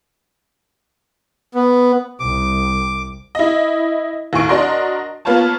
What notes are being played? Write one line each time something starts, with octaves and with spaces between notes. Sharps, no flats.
B3
C2 D6
E4 D#5
D#2 A2 G#5 C#6 D7
D4 F#4 A#4 D#5 C6
A#3 B3 F4 B4 C#5 A5